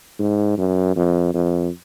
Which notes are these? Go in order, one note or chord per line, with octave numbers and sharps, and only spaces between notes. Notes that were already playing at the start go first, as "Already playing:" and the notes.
G#2
F#2
F2
F2